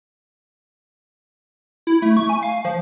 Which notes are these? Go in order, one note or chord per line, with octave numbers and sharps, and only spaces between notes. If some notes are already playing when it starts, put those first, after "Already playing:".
E4
A3
C#6
G#5
F5
F3